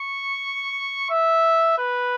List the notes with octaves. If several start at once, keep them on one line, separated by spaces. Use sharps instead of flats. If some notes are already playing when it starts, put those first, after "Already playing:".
Already playing: C#6
E5
B4